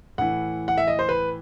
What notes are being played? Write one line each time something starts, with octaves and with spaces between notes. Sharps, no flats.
A2 E3 F#5
F#5
E5
D#5
C5
B4